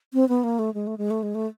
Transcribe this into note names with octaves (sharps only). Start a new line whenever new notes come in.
C4
B3
A#3
A3
G#3
A3
G#3
A3
G#3
A3